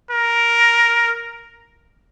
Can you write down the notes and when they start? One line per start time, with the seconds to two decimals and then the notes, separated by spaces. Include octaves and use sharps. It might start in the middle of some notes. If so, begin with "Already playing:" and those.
0.11 A#4